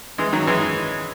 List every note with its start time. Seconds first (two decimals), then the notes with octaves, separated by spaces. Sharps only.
0.18 E3 G#3
0.33 D#3 F#3
0.47 E3 G#3